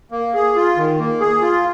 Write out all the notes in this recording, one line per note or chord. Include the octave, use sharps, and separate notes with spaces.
A#3
G#4
F4
D#3
A#3
G#4
F4